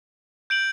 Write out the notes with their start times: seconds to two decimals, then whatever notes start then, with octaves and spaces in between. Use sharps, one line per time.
0.50 G6 D7 F#7